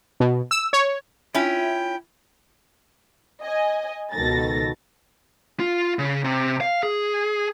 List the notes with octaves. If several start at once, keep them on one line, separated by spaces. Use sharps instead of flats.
B2
E6
C#5
C#4 E4 F4 G5
D#5 G#5
C#2 B2 D#3 A4 A6 A#6
F4
C#3
C3
F5
G#4